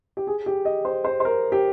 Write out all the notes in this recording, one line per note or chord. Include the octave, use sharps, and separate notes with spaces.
G4
G#4
G4
D#5
C5
C5
C5
A#4
G4